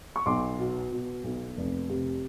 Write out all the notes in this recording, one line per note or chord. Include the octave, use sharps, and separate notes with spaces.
C#6
B1 C6 D6
B2
B2
B1
F1
C3